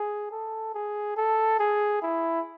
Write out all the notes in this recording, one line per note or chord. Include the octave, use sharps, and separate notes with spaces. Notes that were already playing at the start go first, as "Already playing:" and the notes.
Already playing: G#4
A4
G#4
A4
G#4
E4